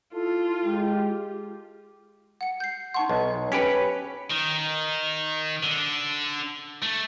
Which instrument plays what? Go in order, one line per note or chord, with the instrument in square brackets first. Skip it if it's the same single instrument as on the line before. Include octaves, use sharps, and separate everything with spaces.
[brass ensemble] E4 A4 [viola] F4
[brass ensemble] G#3 G4
[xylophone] F#5 C#7
G6 C7
[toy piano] D#4 A5 C6 [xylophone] F#5 C#6
[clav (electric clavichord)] B1 [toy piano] C5 D#5 E5
[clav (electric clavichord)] C#4 G4 B4 [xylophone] B6 C#7 D7
[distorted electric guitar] D#3
D3
A3